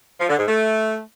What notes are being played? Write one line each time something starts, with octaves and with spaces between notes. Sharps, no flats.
F3
D3
G#2
A3